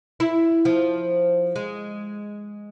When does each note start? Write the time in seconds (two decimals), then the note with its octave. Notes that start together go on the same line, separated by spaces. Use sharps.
0.20 E4
0.65 F3
1.56 G#3